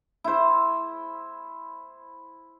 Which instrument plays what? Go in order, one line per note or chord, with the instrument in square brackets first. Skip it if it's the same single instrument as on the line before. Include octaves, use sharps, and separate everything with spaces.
[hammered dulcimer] E4 C5